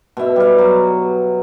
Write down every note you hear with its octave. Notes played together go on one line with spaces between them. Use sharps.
B2 E5
G3 F5
F#3